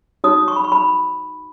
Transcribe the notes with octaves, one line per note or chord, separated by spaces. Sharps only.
D#4 F#4 C#5 D#6
C#6
B5
C#6
B5